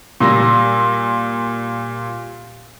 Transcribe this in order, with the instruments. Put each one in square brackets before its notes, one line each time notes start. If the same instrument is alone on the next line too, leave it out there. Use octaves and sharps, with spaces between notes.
[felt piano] A#2 G3 F4 E6 A#6